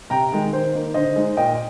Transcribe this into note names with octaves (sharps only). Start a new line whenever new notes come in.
C3 G5 A#5
D#3 G#3
D#3 C5
A#3 D#4
D3 C5 D#5
G#3 D#4
A#2 D#5 G5